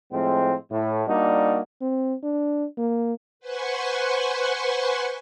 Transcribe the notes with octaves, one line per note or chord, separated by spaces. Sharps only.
A2 F3 G#3 C4
A2
G3 A#3 D4 D#4 F#4
C4
D4
A#3
B4 C5 F#5 G#5 C6 C#6